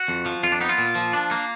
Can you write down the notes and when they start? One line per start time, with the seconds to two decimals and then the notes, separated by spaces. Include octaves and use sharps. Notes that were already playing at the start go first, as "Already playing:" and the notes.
Already playing: F#4
0.08 F2
0.26 F3
0.43 F2 F4
0.52 D4
0.61 B3 D#4
0.69 F4
0.78 A#2
0.95 F3
1.13 D4
1.31 A#3